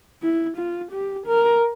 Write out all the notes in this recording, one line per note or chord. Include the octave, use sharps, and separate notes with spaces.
E4
F4
G4
A#4